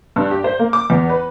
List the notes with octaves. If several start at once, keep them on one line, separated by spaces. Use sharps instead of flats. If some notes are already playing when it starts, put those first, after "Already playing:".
G2
G4
C5
A#3
D6
E2
B4